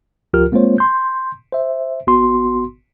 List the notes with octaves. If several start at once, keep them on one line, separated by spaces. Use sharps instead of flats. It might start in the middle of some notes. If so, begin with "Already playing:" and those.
C#2 F3 F4 G4 A#4 F6
G#3 A#3 C4 F4 C5 C#5
C6 G6
C5 E5
G#1 B3 F#4 C6